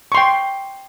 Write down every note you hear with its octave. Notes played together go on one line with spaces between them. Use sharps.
G5 C6 C#6